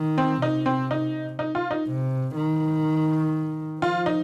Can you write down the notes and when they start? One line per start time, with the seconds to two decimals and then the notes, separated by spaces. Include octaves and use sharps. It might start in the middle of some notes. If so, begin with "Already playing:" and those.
Already playing: D#3
0.18 C4
0.42 C3 D#4
0.66 C4
0.91 D#4
1.39 D#4
1.55 F4
1.71 D#4
1.88 C3
2.35 D#3
3.81 F3 F4
4.06 D#4